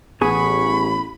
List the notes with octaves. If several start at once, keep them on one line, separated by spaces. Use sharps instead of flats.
A1 B3 G#4 B5 C#6